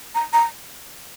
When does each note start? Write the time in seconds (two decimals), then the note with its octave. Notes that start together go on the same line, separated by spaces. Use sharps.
0.15 A#5
0.33 A#5